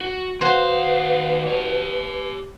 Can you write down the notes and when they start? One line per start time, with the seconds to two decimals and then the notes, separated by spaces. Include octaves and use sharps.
0.01 F#4
0.41 D#2 F#4 B4 C5 F5 C6
1.47 G4 C#5